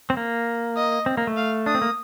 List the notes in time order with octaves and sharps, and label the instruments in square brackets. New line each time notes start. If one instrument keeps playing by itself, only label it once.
[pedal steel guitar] C4
A#3
[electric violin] D#5
[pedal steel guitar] C4
A#3
A3
[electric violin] F5
[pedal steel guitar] D4 [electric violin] D#6
[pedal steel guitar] C4
A#3